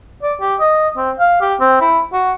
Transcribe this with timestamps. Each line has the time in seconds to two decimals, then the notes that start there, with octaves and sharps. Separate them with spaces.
0.23 D5
0.41 G4
0.60 D#5
0.97 C4
1.19 F5
1.41 G4
1.60 C4
1.81 E4
2.12 F#4